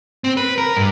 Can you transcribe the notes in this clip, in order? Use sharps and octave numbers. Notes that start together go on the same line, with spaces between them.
C4
B4
A#4
G2